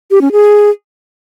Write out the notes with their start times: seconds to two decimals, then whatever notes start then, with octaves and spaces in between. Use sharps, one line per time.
0.11 G4
0.21 C#4
0.32 G#4